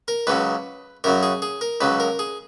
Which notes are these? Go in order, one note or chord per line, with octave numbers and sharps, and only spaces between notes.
A#4
C#2 C#3 F#3 B4
F#2 C#3 F#3 A#4
G#4
G#4
A#4
C#2 C#3 F#3 B4
A#4
G#4